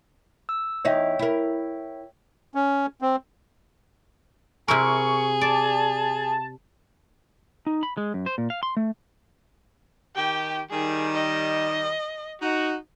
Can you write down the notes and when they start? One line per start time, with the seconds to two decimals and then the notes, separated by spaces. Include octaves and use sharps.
0.49 E6
0.85 E2 D#4 C#5 E5 G5
1.19 E4 A#4
2.55 C#4
3.02 C4
4.68 C3 E4 G#4 A#4 C#6
5.41 D5 A5
7.67 D#4
7.83 B5
7.97 G#3
8.14 F#2
8.26 C5
8.38 A#2
8.50 F5
8.63 C6
8.77 A3
10.16 D#3 G4 G5
10.71 D#3 G3 G#4
11.15 D#5
12.41 D#4 F#4